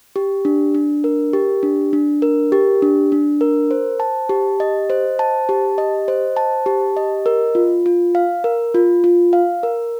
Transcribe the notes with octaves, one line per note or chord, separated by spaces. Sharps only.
G4
D4
D4
A#4
G4
D4
D4
A#4
G4
D4
D4
A#4
C5
A5
G4
D#5
C5
A5
G4
D#5
C5
A5
G4
D#5
A#4
F4
F4
F5
A#4
F4
F4
F5
A#4